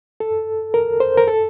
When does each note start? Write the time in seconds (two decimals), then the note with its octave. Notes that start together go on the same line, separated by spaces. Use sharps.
0.20 A4
0.74 A#4
1.00 C5
1.18 A#4
1.28 A4